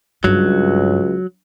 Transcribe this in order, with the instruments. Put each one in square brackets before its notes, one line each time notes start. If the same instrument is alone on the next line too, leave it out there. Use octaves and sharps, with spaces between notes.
[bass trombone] C#2 [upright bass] G2 [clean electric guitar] F#3